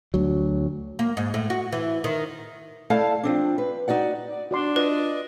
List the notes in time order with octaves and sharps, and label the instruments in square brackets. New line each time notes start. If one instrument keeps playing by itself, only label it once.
[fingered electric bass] D2 F#3
[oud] A#3
G#2
A2
F#4
E3
D#3
[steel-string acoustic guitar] A3 E4 A4 D5 F5 A5
F3 C4 D4
B4
D#4 F#4 D5 F#5
[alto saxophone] D5
[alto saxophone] D4 [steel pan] F#4 D5 C6
[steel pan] F4 [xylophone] B4 [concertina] D5 D#5